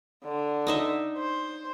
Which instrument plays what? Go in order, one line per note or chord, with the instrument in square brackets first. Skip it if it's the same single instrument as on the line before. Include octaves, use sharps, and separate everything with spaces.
[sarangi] D3
[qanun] D#4 D#5 E5
[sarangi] C5